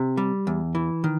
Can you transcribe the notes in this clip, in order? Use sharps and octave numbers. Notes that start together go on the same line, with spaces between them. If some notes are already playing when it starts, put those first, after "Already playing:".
Already playing: C3
G3
E2
E3
D#3